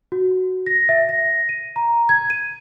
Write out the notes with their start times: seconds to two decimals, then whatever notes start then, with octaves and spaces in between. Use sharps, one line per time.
0.12 F#4
0.66 A#6
0.89 E5
1.09 A#6
1.49 D#7
1.76 A#5
2.09 G#6
2.30 D#7